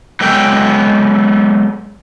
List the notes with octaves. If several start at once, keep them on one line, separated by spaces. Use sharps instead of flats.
F#3 G#3 B3 A4 G5